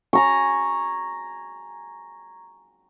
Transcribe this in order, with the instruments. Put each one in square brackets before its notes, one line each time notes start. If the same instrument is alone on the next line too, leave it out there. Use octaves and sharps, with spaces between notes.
[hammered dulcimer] G#5 A#5 C#6